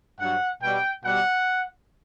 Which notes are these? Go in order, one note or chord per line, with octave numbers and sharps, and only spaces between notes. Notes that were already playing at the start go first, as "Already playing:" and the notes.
G2 F#3 F#5
B2 G3 G5
B2 G3 F#5